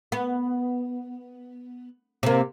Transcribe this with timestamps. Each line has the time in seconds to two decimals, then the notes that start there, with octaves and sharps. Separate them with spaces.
0.12 B3
2.23 C3 A#3